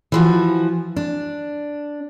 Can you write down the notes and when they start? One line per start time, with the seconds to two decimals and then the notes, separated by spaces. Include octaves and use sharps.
0.12 E3 F3 F#4
0.96 D4